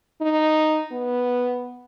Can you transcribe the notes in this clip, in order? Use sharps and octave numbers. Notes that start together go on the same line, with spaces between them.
D#4
B3